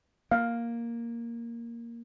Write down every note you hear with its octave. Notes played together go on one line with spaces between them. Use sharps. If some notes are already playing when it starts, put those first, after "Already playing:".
A#3 F5